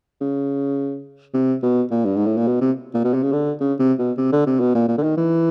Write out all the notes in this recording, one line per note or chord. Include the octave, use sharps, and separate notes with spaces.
C#3
C3
B2
A#2
G2
G#2
A2
A#2
B2
C3
A#2
B2
C3
C#3
D3
C#3
C3
B2
C3
D3
C3
B2
A#2
A#2
D3
D#3
E3